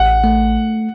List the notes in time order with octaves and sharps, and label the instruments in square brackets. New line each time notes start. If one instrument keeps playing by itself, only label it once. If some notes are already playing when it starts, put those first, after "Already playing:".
Already playing: [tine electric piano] A1 [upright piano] F#5
[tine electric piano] A3